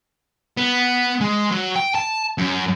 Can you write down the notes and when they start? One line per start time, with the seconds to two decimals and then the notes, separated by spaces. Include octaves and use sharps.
0.57 B3
1.21 G#3
1.51 F#3
1.76 G5
1.95 A5
2.38 F#2